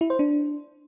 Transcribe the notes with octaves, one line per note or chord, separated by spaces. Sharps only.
E4
C5
D4